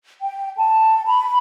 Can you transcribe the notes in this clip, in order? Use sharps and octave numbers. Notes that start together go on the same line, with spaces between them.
G5
A5
B5